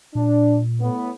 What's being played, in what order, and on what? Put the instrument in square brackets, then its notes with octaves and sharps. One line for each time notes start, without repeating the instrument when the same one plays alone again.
[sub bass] A#2 [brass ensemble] D4
[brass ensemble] A2 B3